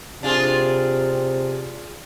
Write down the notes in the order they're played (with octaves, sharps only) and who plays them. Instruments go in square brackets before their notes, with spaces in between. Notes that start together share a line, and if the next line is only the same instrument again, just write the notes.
[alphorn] C3 [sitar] D4 F4 G#4